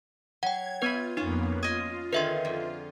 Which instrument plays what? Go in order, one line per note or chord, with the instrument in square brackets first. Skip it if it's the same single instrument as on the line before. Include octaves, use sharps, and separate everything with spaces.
[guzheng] F#3 [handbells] F#5 G5 [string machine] G#6
[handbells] B3 B4 [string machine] F4 [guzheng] G5 G#5 B5
[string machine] F2 A#3 B3 [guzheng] C#4 F4 [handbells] D#4
[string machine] F4 [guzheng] D#5 G#5 [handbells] D#6
[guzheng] D3 D#3 G#4 [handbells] B4 E5 C6
[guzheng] F2